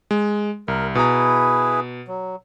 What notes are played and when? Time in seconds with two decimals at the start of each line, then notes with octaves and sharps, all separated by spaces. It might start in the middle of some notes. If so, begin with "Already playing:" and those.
0.11 G#3
0.68 C2 A#4
0.95 B2 E4 G#4 B4 A#5
2.08 F#3